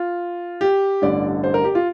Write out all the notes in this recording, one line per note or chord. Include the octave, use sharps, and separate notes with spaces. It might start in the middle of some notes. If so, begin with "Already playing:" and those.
Already playing: F4
G4
A1 G2 D3 D5
C5
A#4
G4
F4